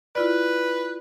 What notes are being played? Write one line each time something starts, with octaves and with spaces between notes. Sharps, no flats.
E4 F4 B4 D5